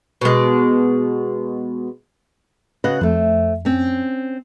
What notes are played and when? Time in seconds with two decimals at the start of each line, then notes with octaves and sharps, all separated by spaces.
0.21 B2 G#3
2.84 C#3 F#4 B4 D#5 F#6
3.01 F2 A3 C5
3.65 C4 C#4